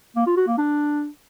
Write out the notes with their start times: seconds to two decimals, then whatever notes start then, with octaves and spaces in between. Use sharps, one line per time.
0.16 A#3
0.27 F4
0.37 F#4
0.47 A#3
0.58 D4